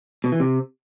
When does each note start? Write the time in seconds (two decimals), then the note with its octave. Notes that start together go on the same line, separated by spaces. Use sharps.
0.24 B2
0.32 E3
0.40 C3